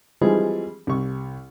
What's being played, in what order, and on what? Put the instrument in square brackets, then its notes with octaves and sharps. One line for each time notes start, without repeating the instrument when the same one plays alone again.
[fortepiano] E3 F3 G3 G#3 C4 G#4
C2 C#6